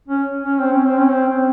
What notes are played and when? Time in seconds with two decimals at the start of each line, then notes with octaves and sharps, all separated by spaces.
0.08 C#4
0.42 C#4
0.59 C4
0.72 C#4
0.85 C4
0.98 C#4
1.10 C4
1.27 C4